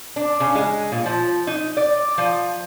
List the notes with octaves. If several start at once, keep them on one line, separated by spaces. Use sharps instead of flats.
D4
C#3
G#3
A#2
F3
D#4
D5
F3